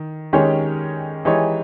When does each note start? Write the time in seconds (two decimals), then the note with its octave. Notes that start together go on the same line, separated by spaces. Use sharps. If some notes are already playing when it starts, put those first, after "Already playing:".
Already playing: D#3
0.33 D#3 G#3 C#4 G4 C#5
1.25 E3 G#3 D#4 G4 C#5